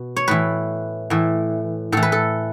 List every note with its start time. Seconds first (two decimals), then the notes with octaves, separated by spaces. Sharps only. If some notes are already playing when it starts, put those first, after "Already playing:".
Already playing: B2
0.16 C#5
0.28 A2 E3 B4
1.10 A2 E3
1.92 A2 E3 A4
2.03 B4
2.12 A4